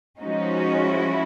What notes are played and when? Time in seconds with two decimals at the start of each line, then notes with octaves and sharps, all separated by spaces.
0.20 F3 G#3 C#4 D#4 F#4
0.90 E4